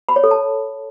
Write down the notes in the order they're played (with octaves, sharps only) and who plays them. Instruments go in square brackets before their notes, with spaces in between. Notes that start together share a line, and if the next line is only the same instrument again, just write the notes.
[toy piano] B5
C#5
A4
A5